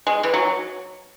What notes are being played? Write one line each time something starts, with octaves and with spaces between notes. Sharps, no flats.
G#3
E3
F#3